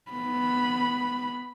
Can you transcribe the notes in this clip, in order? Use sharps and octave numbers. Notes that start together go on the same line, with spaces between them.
B3 B5